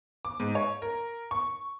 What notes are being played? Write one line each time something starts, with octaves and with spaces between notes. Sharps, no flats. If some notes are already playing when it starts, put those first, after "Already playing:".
D6
G#2
C#5
A#4
C#6